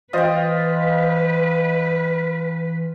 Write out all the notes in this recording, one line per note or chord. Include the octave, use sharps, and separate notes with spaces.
E3 F4 B4 C5 D#5 G5